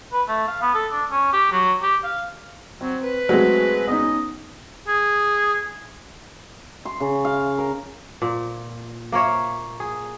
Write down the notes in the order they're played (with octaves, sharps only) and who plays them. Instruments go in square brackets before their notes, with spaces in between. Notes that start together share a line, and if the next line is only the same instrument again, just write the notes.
[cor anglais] B4
A3
F5
B3
A4
D4
C#4
G4
F#3
G4
F5
[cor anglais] F#3 [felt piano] C4
[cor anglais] B4
[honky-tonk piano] F#3 G#3 [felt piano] A3 C4 G#4
[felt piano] B3 C#4 D#4 [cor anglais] D#5
[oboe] G#4
[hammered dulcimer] C6
C#3
F5
A#4
[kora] A#2
A#3 A#4 C#5 E5
G#4